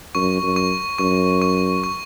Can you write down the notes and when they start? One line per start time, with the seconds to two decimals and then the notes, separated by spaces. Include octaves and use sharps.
0.15 F#2 C#6
0.43 F#2
0.56 C#6
0.99 F#2 C#6
1.42 C#6
1.84 C#6